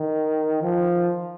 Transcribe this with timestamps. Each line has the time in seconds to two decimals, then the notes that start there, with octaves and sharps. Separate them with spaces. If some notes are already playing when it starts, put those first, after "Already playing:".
Already playing: D#3
0.62 F3